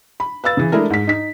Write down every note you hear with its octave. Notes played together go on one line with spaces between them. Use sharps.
B5
B4 F5 E6 A6
C#3 E3
G#3 A3 D4 E4 G#4 A#4
G#2 B6
D#4 B6